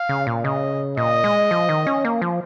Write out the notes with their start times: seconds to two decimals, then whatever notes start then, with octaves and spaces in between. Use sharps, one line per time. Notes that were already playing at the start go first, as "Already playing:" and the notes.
Already playing: F5
0.09 C#3
0.27 A#2
0.44 C#3 D#5
0.97 A#2 D#5
1.24 G#3
1.51 F3
1.69 D#3
1.87 C#4
2.05 A#3
2.22 F3